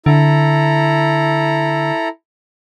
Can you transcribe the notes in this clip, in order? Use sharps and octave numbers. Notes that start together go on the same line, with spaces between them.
D3 E4 A4 A#5